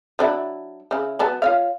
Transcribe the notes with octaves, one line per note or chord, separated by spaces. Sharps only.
F#3 D4 E4
C#3 E4
F#3 B3 A5
F4 C#5 F5